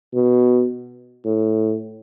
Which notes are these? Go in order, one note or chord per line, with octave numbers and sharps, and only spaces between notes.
B2
A2